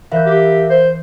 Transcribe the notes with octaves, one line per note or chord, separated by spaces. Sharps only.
E3 A#4 B4 E5 F5 G6
G4
C5